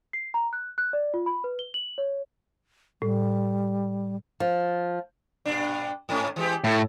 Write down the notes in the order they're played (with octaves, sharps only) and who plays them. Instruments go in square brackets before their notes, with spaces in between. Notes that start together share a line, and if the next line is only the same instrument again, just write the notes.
[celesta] C7
A#5
F#6
F#6
D5
F4
B5
B4
G7
F#7
C#5
[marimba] A2 [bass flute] G3
[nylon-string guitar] F3
[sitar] G2 A#2 D4
G#2 A3 C#4
E3 G#3 G4
[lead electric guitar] A2 [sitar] E4 A4